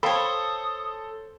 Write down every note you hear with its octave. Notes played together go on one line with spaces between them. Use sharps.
A4 C5 C#5 F5 G5 B5 D#6